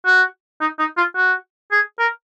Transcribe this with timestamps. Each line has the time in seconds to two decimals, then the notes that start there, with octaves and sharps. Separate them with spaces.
0.06 F#4
0.61 D#4
0.79 D#4
0.97 F4
1.16 F#4
1.72 G#4
1.99 A#4